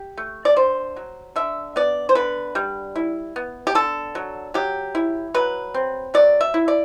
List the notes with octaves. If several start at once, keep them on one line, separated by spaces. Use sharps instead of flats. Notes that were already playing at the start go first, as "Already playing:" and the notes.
Already playing: G4
A3
D5
D3 C5
F#3
D3 E5
B3 D5
C5
D3 B4
G3
E4
B3
G4
D3 A4
F#3
F#3 G4
E4
F#3 B4
C4
F#3 D5
E5
E4
D5